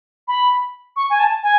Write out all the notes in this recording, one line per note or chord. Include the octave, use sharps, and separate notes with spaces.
B5
C#6
G#5
A5
G#5